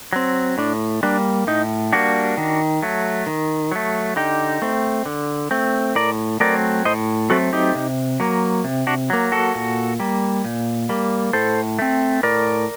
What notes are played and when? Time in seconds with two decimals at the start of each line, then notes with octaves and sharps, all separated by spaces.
0.13 F#3 C4
0.58 A2 D4
1.03 G3 A#3 D4
1.47 A2 D#4
1.93 G3 A#3 D4 F#4
2.37 D#3
2.82 F#3 A3
3.27 D#3
3.72 F#3 A3
4.16 D3 D#4 G4
4.62 A3 C4
5.06 D3
5.51 A3 C4
5.95 A2 A#4 D5
6.40 F#3 A3 C4 A#4 D5
6.85 A2 C5 D#5
7.30 F#3 A3 C4 F#4 A4
7.53 D#4 G4
7.75 C3
8.20 F#3 A#3
8.64 C3
8.87 D4 F#4
9.10 F#3 A#3
9.32 F#4 A4
9.55 A#2
10.00 G3 A#3
10.45 A#2
10.89 G3 A#3
11.33 A2 A4 C5
11.79 A3 C4
12.23 A2 A#4 D5